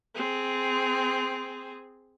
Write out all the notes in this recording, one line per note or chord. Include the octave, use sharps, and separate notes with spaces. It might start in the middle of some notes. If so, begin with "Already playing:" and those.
C4 G#4